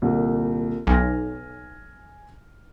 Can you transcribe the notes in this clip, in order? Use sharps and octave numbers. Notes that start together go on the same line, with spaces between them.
C2 A#2 D3
B1 G#5 F6 A#6